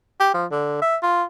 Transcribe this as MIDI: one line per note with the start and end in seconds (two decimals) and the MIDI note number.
0.20 0.30 67
0.34 0.46 53
0.51 0.80 50
0.82 0.97 76
1.03 1.23 65